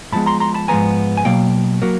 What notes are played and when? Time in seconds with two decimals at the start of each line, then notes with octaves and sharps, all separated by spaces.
0.12 G#2 F3 G#3 B3 A5 B5
0.26 A#5 C6
0.40 A#5 C6
0.54 A5 B5
0.68 G#2 F3 G#3 B3 G#5 A#5
1.17 G#5
1.25 B2 F#3 A#3 F5 G5
1.82 F#3 A#3